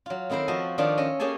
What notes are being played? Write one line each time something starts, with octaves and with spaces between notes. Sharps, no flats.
F#3 F4
D#3 C4 E4 A#4 C5
F3 F#4 D#5 A5
D#3 F3 D4 F4 C#5 D5
C#4 D#5 E5
A#3 C#4 G4 G#4 G#5 A5